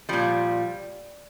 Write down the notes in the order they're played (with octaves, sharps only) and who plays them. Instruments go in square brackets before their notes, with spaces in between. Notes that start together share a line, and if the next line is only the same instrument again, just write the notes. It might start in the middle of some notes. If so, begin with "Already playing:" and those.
[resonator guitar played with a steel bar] A#2 F3 G3